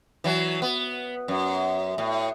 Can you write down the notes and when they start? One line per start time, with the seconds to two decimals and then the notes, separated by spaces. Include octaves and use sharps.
0.24 E3 F#3
0.62 B3
1.28 F#2
1.98 A2